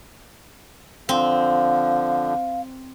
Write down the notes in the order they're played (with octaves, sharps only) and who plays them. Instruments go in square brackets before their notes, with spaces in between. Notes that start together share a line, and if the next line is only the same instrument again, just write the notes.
[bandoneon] D3 F3 [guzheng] C4 [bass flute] F5